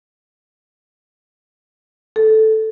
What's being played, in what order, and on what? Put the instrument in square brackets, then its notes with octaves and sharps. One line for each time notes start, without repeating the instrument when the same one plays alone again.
[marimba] A4